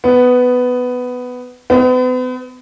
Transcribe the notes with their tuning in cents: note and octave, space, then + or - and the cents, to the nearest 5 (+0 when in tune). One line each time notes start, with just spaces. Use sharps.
B3 +10
B3 +40